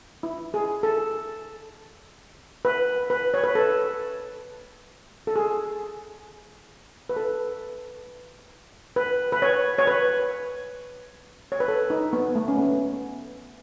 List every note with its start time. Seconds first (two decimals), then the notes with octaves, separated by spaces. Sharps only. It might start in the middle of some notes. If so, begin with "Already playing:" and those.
0.23 E4
0.54 G#4
0.83 A4
2.65 B4
3.10 B4
3.34 C#5
3.44 B4
3.55 A4
5.27 A4
5.36 G#4
7.09 B4
7.16 A4
8.96 B4
9.32 B4
9.42 C#5
9.78 C#5
9.87 B4
11.52 C#5
11.60 B4
11.68 A4
11.90 D#4
12.13 B3
12.35 A3
12.48 C#4
12.58 B3